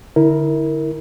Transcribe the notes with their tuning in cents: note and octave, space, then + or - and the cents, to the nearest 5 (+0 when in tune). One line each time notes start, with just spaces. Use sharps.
D3 +5 E4 -25 A#4 +0